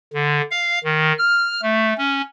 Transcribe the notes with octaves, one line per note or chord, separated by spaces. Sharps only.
D3
F5
D#3
F6
A3
C#4